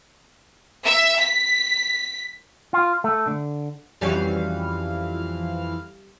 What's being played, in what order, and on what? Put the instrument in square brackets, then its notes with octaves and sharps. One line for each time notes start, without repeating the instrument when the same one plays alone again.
[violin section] E5
B6
[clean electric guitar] F4
A3
D3
[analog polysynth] F2 E3 F5 [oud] G3 C#4 F#4